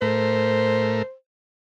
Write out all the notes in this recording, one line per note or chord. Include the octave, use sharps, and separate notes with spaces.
A2 A3 A#4 C5